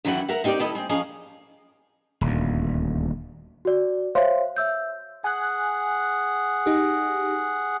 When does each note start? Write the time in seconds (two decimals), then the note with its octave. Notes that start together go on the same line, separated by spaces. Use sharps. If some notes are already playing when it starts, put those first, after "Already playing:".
0.05 F#2 D#3 E3 F#3 E4 F#5
0.28 A#4 E5 F#5
0.44 C4 D#4 G4 A4 A#4 D5
0.59 D#3 G3 E4 A4 D#5
0.75 G#3 C4
0.89 F3 C#4 G#4 D#5 F5 A#5
2.21 D#1 D2
3.65 F#4 D5
4.15 C5 C#5 E5 F5 C6
4.56 E5 E6 G6
5.24 G#4 F#5 G#5 F#6
6.66 D#4 G4